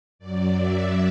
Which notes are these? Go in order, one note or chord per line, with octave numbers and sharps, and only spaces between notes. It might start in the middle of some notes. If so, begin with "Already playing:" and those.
F#2 F#3 D5
E5